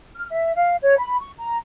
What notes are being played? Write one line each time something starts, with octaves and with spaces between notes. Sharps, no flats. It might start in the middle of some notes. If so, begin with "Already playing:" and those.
F6
E5
F5
C#5
B5
C#6
A#5